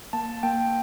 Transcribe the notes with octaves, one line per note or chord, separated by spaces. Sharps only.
A#3 A5
A#3 G5